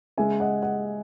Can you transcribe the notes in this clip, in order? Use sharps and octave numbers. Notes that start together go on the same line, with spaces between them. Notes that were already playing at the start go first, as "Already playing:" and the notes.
C#3 G#3 E5 G#5
D#5 F#5
D#5 F#5